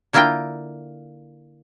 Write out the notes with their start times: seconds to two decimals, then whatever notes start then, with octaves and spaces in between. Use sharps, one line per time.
0.13 D3 A#3 E4 F4 A#4 G5